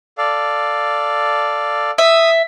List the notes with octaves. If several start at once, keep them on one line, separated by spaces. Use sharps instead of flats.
A4 D5 F5
E5 D#6 E6